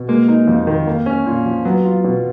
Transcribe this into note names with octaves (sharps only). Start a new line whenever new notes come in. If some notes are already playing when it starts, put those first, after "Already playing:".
Already playing: B2
G#3 A#3
D#4
F2
D#3
A#3
C#4
A#2
F3
F#3 B3
F4
B2